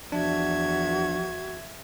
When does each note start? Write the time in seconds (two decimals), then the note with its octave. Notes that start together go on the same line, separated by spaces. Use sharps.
0.12 E2 F3 D4 F#4 E5 G#6